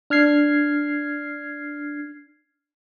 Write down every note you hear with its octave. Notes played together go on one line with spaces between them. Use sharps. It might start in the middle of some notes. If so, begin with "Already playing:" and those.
D4 F6 G#6 C7